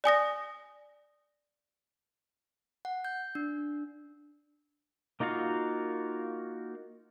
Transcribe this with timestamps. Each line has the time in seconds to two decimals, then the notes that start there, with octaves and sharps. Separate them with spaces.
0.04 D5 G#5 D#6 A#6
2.85 F#5
3.05 G6
3.35 D4
5.20 A#3 D#4 F4 F#4 F5